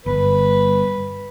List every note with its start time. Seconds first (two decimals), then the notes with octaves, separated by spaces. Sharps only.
0.06 G1 B4